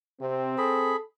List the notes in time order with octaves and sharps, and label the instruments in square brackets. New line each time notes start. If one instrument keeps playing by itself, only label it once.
[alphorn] C3 [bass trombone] C4
[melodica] G#4 B5 [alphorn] A4